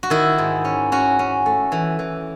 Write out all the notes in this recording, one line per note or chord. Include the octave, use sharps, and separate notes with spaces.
F#4
D#3 E4
G#2
C#4
C#4 F#4
C#4
A3
E3
E3